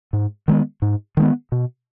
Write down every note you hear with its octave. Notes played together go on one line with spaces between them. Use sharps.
G#2
D#3 G#3 B3
G#2
D#3 G#3 B3
B2